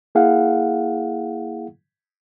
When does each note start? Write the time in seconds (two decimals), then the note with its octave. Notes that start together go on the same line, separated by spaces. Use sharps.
0.15 A#3 E4 G#4 F5 F#5